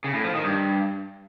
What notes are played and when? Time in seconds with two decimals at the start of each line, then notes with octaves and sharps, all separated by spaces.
0.04 C#3
0.14 A2
0.24 F3
0.34 D#3
0.44 G2